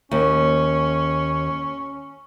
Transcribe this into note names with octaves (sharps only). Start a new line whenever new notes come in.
D#2 C#4